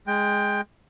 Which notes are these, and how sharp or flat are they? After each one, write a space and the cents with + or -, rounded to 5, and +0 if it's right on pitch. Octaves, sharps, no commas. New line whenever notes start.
G#3 +0 G5 +15